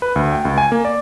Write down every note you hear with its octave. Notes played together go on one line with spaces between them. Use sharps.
B4
D2
G5
C#2
G#5
A#3
D5